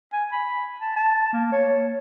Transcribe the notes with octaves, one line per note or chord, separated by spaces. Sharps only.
G#5
B5
A5
A5
A#3
C#5